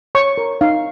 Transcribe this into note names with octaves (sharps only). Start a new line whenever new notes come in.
C#5 C#6
A#4
D#4 F5